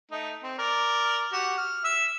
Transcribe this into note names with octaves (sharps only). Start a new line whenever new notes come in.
A3 D#4
C4
A#4 D5
F#4 G4
F6
E5 E6